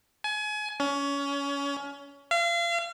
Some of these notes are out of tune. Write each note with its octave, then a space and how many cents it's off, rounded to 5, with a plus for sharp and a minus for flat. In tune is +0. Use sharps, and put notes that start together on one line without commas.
G#5 +30
C#4 +25
F5 -35